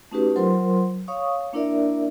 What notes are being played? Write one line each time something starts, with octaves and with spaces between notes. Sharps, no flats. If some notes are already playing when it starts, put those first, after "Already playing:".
A3 C#4 D#4 F#4 G4 B4
F#3 F4 A#4 C5 C6
C#5 F5 C#6 D#6
A#3 D4 E4 A#4 D5 E5